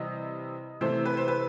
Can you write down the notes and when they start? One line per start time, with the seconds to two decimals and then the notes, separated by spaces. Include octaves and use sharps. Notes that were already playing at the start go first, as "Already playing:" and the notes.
Already playing: C3 E3 G3 D#5
0.81 C3 E3 A3 C5
1.05 B4
1.17 C5
1.28 B4